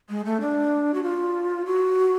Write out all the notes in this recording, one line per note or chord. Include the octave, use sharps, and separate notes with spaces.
G#3
A3
D4
F#4
F4
F#4